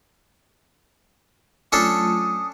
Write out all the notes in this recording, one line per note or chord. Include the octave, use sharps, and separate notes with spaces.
F#3 A3 C#4 D4 F4 A4 D#6